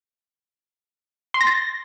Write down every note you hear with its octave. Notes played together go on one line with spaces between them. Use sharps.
C6
A#6
A6